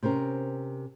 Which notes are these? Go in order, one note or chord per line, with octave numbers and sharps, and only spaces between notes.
C3 C4 C#4 A#4